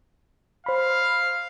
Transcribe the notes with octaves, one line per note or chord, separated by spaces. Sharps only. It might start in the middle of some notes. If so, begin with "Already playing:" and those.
C5 F5 B5